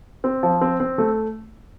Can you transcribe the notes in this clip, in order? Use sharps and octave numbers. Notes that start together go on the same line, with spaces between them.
C4
F3
C4
C4
A3